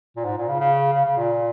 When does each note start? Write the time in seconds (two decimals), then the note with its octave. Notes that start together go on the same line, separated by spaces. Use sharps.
0.17 A#2
0.25 G#2
0.37 A#2
0.48 C#3
0.60 C#3
0.94 C#3
1.05 C#3
1.17 A#2